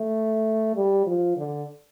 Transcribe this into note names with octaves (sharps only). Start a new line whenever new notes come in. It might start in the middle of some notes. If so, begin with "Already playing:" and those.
Already playing: A3
G3
F3
D3